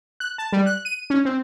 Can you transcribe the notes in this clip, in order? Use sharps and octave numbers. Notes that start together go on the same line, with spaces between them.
F#6
A5
G3
F#6
D#7
C#4
C4